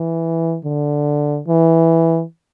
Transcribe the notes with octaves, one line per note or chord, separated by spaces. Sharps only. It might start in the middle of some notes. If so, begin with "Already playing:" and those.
Already playing: E3
D3
E3